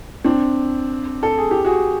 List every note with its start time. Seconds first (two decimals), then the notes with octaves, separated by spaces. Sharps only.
0.24 C4 D4
1.23 A4
1.38 G#4
1.51 G4
1.64 F#4 G#4